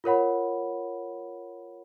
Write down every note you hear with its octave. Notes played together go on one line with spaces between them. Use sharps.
F4 A#4 C#5 F#5 B5